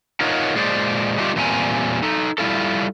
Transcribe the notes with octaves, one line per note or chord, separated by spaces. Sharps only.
D#4 F4 A#4 C#5 F#5
A#2 G#3 G#4 C5 D5
G3 A3 D4 D#4 F4 G4
E2 A#2 G3 C4 A#4 G#5
D#4 A4
G3 E4 F4 A4